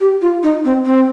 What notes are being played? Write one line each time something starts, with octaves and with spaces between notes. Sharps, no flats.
G4
F4
D#4
C4
C4